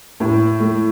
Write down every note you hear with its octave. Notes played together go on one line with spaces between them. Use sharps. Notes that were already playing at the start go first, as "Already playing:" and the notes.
A2
A3